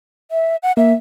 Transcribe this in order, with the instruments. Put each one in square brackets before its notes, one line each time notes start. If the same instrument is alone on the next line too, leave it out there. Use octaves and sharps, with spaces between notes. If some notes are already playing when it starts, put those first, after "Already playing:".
[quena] E5
F#5
[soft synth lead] A#3 [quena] E5